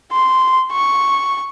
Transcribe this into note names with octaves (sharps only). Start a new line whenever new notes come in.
C6
C#6